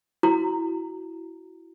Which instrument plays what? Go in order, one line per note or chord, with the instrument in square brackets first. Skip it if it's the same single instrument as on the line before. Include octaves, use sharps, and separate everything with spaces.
[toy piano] E4 F#4 A#5